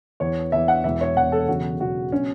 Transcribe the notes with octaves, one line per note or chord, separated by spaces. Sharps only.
E2 E3 C#5
E2 E3 E5
F#5
E1 E2 E3 E5
C#5
E1 E2 E3 F#5
A4
E1 E2 C#3 F#3 F#4
E1 E2 C#3 F#3 F#4
B2 F#3 C#4